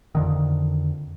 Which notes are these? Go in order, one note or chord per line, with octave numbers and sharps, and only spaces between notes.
F2 D3 D#3